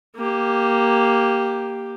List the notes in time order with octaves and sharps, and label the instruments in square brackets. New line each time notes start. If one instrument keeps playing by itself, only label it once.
[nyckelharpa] A#3 G4